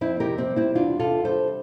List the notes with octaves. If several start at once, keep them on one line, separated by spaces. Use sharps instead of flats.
F2 C4 E4
G4 A#4
C3
C4
G3
C4 E4
E2 D4 F4
C3 F4 A4
G3 A4 C5